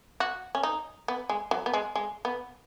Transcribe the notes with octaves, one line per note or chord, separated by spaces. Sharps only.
F#4
C#4
D#4
B3
G#3
F#3
B3
G#3
G#3
B3